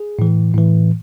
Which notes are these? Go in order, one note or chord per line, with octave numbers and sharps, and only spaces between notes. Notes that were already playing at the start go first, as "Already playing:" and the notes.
Already playing: G#4
A2 E3
A2 E3